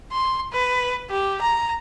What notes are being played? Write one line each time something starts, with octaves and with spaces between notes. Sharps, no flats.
C6
B4
G4
A#5